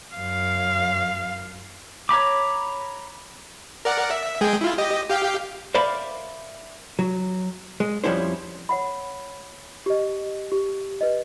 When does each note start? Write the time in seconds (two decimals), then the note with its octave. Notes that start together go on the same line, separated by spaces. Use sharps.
0.15 F#2 F5
2.09 C#5 A#5 B5 D6
3.85 A#4 D5 F#5
4.11 E5
4.41 G#3 G#4 G5
4.61 E4 F4
4.78 G4 D#5
5.10 G4 F5 G5
5.74 A#4 C5 D5 E5 F5 B5
6.99 F#3
7.80 G#3
8.04 F2 F3 G3 C#4 E4 C5
8.69 C#5 F#5 B5
9.86 G4 D#5
10.52 G4
11.01 B4 D#5